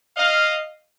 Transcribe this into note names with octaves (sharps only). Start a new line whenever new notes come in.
D#5 F5